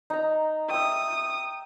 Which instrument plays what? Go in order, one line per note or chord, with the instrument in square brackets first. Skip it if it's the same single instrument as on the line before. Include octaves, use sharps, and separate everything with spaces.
[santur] D#4 A#5
[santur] E5 G5 [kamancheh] D#6